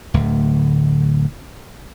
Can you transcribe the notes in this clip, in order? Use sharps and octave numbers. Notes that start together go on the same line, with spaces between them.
D1 D2